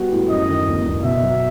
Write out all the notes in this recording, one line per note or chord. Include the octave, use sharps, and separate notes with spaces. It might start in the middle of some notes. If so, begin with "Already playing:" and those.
Already playing: G3 B3 F#4
A2
F#2 D#5
D#3
G1
G1
B2 E5
F#3